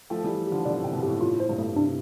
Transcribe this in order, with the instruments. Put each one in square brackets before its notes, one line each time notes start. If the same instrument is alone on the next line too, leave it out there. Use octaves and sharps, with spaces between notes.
[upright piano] F3 A3 [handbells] G5
[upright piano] E3 G3 [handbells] G4
[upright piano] D3 F3 [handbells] G4
[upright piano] B2 D3 [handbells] D5
[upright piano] A2 C3 [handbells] G5
[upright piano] G2 B2
[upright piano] A2 [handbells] G4
[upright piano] A2 [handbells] F4
[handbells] C5
[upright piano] G2 B2
[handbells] A3
[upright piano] A2 C3 [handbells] D4